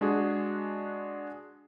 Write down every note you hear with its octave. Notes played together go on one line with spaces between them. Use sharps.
G#3 D4 F#4 G#4